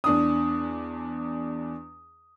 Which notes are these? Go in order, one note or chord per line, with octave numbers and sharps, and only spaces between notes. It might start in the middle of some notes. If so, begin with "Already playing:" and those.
E2 D4 D#6